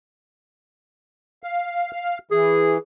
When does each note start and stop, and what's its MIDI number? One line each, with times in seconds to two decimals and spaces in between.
1.43 1.93 77
1.93 2.18 77
1.93 2.18 89
2.31 2.78 52
2.31 2.76 68